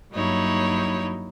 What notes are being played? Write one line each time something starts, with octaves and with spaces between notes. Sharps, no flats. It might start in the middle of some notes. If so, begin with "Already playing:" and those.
G2 F#3 A#3 D#4 E4 C#5